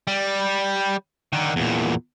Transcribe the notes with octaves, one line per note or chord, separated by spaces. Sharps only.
G3
D3 D#3
E2 A#2